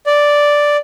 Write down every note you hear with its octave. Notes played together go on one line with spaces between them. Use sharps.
D5